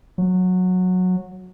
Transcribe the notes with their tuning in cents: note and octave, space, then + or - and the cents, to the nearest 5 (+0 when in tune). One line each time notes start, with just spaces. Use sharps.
F#3 -15